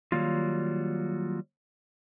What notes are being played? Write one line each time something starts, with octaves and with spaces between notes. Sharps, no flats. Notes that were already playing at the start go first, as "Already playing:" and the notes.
D#3 F#3 G3 A#3 F4